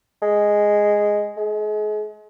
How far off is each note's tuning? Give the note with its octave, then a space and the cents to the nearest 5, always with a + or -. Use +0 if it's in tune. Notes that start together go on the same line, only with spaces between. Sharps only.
G#3 -5
G#3 +35